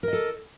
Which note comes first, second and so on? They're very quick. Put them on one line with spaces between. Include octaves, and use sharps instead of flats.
A#4 D#5 A4